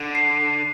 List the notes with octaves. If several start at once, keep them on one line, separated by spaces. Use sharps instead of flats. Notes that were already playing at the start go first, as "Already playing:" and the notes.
Already playing: D3
C7